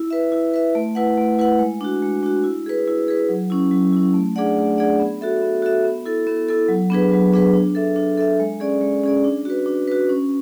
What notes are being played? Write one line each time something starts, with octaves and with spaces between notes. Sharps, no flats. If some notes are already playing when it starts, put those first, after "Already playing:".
Already playing: E4
B4 E5
E4
B4 E5
A3
E4 B4 F#5
A3
E4 B4 F#5
G#3
D4 F#4
G#3
D4 F#4
E4
G#4 B4
E4
G#4 B4
F#3
C#4 E4
F#3
C#4 E4
A3
D4 G#4 D5 F#5
A3
D4 G#4 D5 F#5
B3
F#4 A4 E5
B3
F#4 A4 E5
B3
E4 A4
B3
E4 A4
F#3
B3 D4 G#4 B4
F#3
B3 D4 G#4 B4
D4
A4 E5
D4
A4 E5
G#3
C#4 G#4 D5
G#3
C#4 G#4 D5
D4
F#4 B4
D4
F#4 B4
C#4